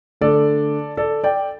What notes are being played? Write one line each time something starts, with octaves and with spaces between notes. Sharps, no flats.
D3 A3 D4 A4 D5
A4 D5
D5 G5